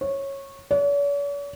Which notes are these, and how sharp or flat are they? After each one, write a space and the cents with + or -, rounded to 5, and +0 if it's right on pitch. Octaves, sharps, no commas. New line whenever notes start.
C#5 -15
C#5 +45